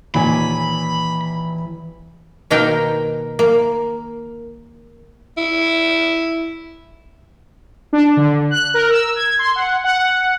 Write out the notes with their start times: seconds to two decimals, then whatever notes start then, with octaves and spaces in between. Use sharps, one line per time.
0.15 D#2 A#2 E3 G#5 B5
2.50 B2 D#3 A#3 A#4 G5
3.39 A#3
5.37 E4
7.93 D4
8.17 D3
8.51 F#6
8.74 A#4
8.90 E6
9.15 G#6
9.39 C6
9.55 F#5
9.84 F#5